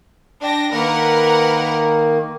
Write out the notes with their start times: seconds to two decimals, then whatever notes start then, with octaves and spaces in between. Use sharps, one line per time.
0.42 D4 G5 A#6
0.73 D#3 A#3 A#4 B4 F#5